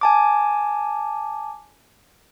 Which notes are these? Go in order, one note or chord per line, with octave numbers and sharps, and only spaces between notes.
G#5 A5 D6